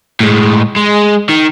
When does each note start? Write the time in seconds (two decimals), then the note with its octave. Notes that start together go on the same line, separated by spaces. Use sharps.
0.20 A2 G#3
0.76 G#3
1.29 D#3